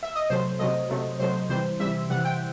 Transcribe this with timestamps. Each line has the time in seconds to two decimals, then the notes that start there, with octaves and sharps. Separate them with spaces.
0.03 E5
0.15 D#5
0.30 C3 F#3 A3 C5
0.59 C3 F#3 A3 D#5
0.89 C3 F#3 A3
1.20 C3 F#3 A3 C5
1.49 C3 E3 G3 C5
1.80 C3 E3 G3 E5
2.10 C3 E3 G3 F#5
2.25 G5